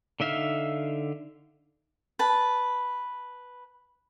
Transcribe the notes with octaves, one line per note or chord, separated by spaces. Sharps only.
D3 D#4 E5 F5 F6
B4 A5